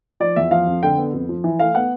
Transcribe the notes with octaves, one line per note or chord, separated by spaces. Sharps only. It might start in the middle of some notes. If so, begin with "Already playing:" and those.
F3 D5
E2 E5
F3 F5
F2
D3 G5
B3
F2
F3
E3
A3 F5
B3 F#5